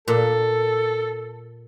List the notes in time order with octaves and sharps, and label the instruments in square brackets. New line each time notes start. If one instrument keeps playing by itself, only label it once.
[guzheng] A#2 [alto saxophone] A4